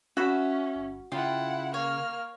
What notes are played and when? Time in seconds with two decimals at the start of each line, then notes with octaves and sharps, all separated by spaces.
0.17 C#4 F#4 E5 B5
0.75 G1
1.12 C#3 E4 F4 F#5 G5
1.74 A#3 C#5 F6